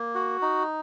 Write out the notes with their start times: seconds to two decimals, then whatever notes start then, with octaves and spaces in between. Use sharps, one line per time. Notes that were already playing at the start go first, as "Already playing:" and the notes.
Already playing: A#3
0.15 F#4
0.42 D#4